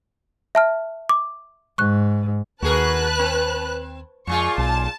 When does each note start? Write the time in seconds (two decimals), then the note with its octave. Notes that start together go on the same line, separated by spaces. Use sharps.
0.55 E5 A5 F6
1.09 D6
1.78 G#2 C#6 F#6
2.62 D#2 D#3 F#4 G#4 A#4 B4 A5 F#6
3.19 C4
4.27 F2 A#2 G#3 F4 C#6
4.58 B1 A5